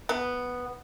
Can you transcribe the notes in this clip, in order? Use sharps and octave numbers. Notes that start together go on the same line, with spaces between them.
B3